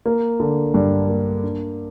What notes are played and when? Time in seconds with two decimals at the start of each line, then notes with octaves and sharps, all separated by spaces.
0.06 A#3
0.40 D3
0.74 G2
1.08 A#3
1.43 D4